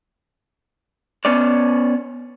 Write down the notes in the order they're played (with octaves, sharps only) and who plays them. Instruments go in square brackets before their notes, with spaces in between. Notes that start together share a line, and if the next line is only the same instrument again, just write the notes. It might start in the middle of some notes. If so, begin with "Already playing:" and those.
[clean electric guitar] B3 C#4 C#5 D5